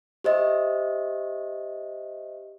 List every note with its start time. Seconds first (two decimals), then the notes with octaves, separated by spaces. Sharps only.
0.24 G4 C5 D#5 E5